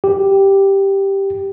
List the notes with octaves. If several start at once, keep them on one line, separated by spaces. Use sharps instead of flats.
G4